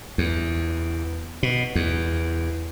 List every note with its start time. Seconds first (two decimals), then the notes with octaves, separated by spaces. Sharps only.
0.18 E2
1.43 B2
1.75 E2